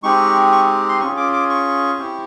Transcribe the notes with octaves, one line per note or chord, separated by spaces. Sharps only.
G#3 C4 D#4 G4 C#6
C#6
C6
C#4 F4 G#4 C#6
D6
D6
C#6
C4 E4 G4